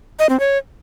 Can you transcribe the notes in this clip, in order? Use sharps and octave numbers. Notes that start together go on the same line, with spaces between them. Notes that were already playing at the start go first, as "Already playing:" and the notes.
D#5
C4
C#5